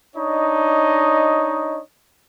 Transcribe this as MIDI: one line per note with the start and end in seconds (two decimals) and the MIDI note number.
0.16 1.81 62
0.16 1.81 63
0.16 1.81 73
0.16 1.81 75